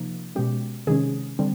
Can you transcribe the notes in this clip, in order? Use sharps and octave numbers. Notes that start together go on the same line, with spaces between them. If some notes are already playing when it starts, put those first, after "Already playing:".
Already playing: C3 F3 A#3 D#4
B2 G#3 C#4 G4
C3 D#3 G#3 C#4 G#4
D3 G3 C4